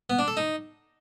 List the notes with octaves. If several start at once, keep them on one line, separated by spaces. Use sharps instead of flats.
B3
D4
A4
D#4